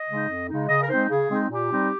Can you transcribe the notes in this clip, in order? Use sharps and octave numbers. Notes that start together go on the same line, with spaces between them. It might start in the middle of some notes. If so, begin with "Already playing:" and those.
Already playing: D#5
C#3 G#3 D#4
F2
C#3 G#3 D#4
C#3 D#5
A#4
G#3 C4 D#4 C5
C#3 G#4
G#3 C4 D#4
A#2 G4
G3 C4 D#4